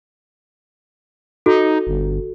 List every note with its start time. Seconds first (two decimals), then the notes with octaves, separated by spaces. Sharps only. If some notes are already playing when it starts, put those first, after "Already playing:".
1.46 D#4 F#4 A4
1.87 G1